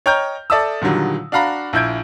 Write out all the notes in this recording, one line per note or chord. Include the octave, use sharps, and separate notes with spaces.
C#5 D#5 G5 A#5 F6 G6
A4 D5 E5 A5 D#6 E6
A#2 D3 D#3 F#3 G3
D4 F#4 F5 A#5 B5
A#1 E4 E5 G6 G#6 D7